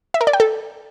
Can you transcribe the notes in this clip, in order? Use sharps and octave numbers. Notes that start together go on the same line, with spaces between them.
E5
A#4
D5
G5
A4